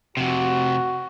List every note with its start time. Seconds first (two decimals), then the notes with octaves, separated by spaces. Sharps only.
0.17 F2 C3 F#4